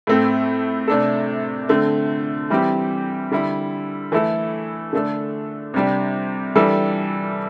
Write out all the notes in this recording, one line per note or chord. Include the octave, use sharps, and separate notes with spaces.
A2 A3 C4 A4
C3 A3 D4 A4
D3 A3 C4
E3 G3 C4 G4
D3 G3 E4
E3 A3 E4 A4
D3 A3 D4 A4
C3 G3 D4 G4
E3 G3 D4 A4